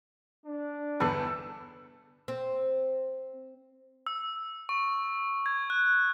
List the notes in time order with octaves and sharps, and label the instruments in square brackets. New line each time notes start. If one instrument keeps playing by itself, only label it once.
[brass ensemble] D4
[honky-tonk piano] G1 E2 [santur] A4 B4
[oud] C4
[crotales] E6
C#6
G#6
F#6